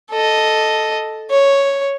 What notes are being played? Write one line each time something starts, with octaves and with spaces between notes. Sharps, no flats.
A4 D#5
C#5